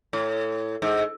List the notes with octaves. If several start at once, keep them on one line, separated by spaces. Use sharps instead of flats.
A2
G#2